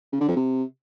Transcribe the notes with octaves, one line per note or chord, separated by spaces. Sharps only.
C#3
D3
F2
C3